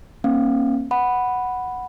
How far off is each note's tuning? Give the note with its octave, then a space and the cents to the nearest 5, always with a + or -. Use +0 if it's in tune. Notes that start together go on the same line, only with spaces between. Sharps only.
A#3 +15 C#4 -40 F5 +0
F#5 +0 B5 +0